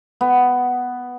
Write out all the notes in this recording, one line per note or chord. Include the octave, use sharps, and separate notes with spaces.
B3